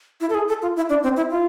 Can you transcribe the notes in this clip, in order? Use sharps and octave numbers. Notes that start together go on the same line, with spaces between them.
E4
A4
G#4
A4
F4
E4
D4
C4
E4
F4